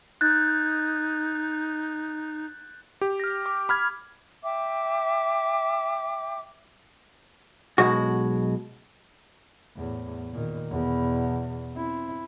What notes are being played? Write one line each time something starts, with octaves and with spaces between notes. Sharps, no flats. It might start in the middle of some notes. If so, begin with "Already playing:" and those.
D#4 F#6 G6 A6
G4
F6 A#6
D6
B5 F6 G#6
E5 G5 D6
B1 B2 G#3 F#4
E2 A2
A#2 D#3
E2 B2
C4 E4